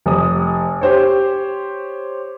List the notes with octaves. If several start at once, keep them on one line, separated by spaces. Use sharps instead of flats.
F1 D#6
G4 C5 C#5